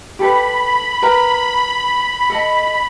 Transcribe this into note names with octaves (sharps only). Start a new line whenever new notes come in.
G4 A4 B4 B5
A#4 B4 A#5
A4 D#5 A5